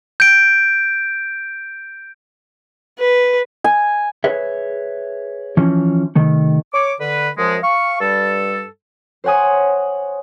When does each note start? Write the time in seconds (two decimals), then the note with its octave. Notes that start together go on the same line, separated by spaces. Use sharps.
0.20 G6 D7
2.99 B4
3.64 G#5
4.24 G#4 B4 C#5 E5
5.57 E3 F3 C#4
6.16 C3 D#3 A3
6.74 C#5 D6
6.99 D3 B4
7.36 F#2 F3 G#3
7.63 F5 C#6
8.00 G2 G3 A4
9.24 C5 C#5 F#5 G#5 D#6